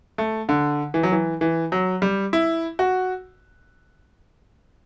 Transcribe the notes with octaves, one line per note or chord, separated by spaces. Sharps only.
A3
D3
E3
F#3
E3
E3
F#3
G3
E4
F#4